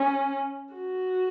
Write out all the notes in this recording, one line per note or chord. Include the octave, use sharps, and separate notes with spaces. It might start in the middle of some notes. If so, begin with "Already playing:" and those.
Already playing: C#4
F#4